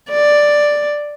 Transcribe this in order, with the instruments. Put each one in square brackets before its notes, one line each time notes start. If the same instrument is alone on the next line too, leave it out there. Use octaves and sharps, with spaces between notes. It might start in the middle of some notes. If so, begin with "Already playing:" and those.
[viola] D5